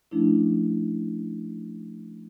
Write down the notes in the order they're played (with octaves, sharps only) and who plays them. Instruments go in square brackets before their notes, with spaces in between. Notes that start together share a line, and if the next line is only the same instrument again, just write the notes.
[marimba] F3 A3 C#4 D4 E4